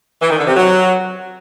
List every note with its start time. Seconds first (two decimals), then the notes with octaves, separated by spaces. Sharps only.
0.21 E3
0.30 D#3
0.39 D3
0.47 C3
0.56 F#3